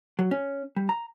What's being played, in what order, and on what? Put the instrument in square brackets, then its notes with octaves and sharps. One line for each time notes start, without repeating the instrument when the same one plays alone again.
[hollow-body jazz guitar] F#3
C#4
G3
A#5